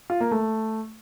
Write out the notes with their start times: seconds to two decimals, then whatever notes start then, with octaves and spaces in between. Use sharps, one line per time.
0.10 F4
0.21 A#3
0.31 A3